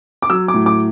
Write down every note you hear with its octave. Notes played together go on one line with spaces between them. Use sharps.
D6
F#3 E6
D6
A2
D6